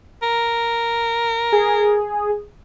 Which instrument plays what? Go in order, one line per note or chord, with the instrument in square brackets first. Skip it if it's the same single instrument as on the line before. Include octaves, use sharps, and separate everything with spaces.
[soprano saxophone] A#4
[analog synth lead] G#4